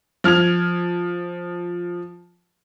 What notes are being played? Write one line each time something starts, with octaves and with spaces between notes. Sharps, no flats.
F3 F6 G#6 F7